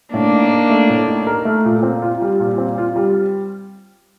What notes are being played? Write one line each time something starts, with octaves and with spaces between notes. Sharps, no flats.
A2 A#3 D4
D#4
A#4
A3
A2
D#4
A#4
A3
A#2
C4
F4
G3
A#2
C4
F4
G3